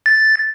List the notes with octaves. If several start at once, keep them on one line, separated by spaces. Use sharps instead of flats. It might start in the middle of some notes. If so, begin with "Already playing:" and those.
A6